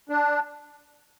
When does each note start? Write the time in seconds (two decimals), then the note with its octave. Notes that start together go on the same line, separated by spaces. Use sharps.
0.09 D4